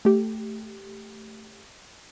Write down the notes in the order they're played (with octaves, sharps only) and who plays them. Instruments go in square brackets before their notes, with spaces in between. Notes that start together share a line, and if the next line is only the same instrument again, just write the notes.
[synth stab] A3 G4